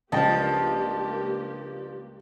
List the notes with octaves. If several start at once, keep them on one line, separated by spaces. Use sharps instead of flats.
C#2 G2 F3 A#3 G4 D#5 G5 A5